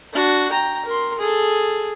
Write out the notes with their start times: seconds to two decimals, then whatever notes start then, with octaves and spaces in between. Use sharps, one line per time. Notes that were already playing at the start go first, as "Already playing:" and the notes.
0.13 D4 F#4
0.51 G5 A#5
0.86 A#4 C6
1.19 G#4 A4